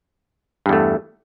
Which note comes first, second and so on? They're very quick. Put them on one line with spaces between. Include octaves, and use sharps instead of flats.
G2 E2 A3